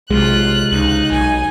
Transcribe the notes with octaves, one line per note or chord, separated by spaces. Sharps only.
B1 C3 G#3 F4 F#6
C#2 D#4
B1 G#5